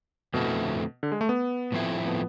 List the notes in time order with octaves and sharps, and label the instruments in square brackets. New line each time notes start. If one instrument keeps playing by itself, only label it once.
[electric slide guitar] F2 D3 A3 C4 E4 [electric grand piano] B2
[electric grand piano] D3
G#3
A3
B3
[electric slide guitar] A2 F3 A3 C4 E4
[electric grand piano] B3